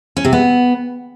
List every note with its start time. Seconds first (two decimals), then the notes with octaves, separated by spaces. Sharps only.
0.17 C#4
0.25 C3
0.33 B3